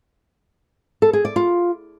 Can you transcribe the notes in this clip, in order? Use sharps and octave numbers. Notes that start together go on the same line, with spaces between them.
A4
G#4
D5
F4